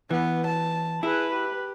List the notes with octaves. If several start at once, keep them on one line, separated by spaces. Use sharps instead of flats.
E3 B3
A5
E4 G#4 B4
G4